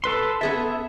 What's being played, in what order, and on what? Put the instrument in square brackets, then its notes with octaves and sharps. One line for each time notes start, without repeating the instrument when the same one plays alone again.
[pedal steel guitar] A4 B4 C6
[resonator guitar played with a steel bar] B3 G#4 A4 [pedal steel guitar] E5